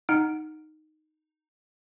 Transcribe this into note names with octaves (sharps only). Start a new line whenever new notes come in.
D#4 F#5 F6 D7